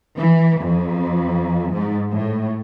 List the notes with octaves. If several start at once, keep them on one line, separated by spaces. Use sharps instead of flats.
E3
F2
G#2
A2